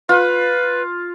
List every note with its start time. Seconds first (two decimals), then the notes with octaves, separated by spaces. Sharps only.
0.09 F4 B4